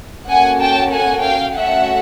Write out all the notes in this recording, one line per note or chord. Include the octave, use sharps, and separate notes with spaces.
A#3 C#4 F#4 A4 F#5 G#5
G5 A5
F#5 G#5
F5 G5
A3 C#4 F#4 A4 E5 F#5